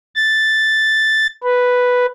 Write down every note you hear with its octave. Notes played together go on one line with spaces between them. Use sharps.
A6
B4